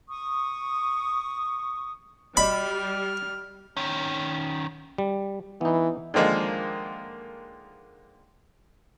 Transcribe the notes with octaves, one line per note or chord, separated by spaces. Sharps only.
C#6 D#6
G3 F#4 D5 D#5 B5 F6
D#3 C#4
G3
E3 B3 D#4
D3 D#3 F3 G#3 A#3